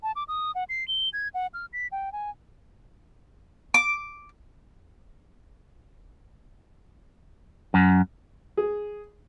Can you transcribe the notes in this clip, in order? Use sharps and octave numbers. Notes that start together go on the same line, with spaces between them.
A5
D6
D#6
F#5
C7
G7
G#6
F#5
F6
B6
G5
G#5
D6
F#2
G#4